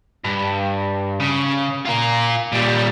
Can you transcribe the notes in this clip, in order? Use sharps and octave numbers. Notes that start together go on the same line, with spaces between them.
G2
C#3
F4 A#4
A#2 G3